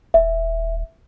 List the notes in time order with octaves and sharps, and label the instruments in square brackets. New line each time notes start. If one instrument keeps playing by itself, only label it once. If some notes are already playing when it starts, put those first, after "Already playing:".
[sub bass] D#1 [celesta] E5